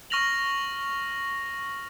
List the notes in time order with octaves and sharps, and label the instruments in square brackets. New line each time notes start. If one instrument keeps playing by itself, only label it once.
[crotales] C#6 F6 A#6 F7 F#7